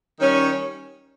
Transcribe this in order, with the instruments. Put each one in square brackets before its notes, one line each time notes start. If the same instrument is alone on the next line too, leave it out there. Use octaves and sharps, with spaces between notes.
[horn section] D#3 G3 C#4